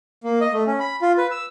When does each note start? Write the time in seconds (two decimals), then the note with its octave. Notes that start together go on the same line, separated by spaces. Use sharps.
0.24 A#3
0.41 D#5
0.53 A3
0.67 C#4
0.80 B5
1.02 F4
1.18 B4
1.31 E6